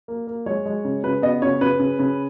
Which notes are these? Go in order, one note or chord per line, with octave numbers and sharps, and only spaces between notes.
A#3
A#3
G#3 C#5
G#3
C#3
C#3 B4
B3 D#5
C#3 C#5
C#3 B4
C#3
C#3